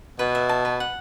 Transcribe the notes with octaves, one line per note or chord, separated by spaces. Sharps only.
B2 B4
E5
A5
B4
F#5